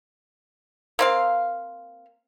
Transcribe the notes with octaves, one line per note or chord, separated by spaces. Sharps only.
A#3 C4 F5